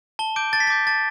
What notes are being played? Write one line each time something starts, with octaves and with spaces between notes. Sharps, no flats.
A5 G7
D6 G6 D7
A5 A6
B6
D6 G6 A6
A5 A6